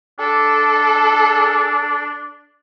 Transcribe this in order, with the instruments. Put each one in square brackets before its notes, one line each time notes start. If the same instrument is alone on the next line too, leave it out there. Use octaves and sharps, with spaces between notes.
[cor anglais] D4 [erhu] A4